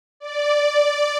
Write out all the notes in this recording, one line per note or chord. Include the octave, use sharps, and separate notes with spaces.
D5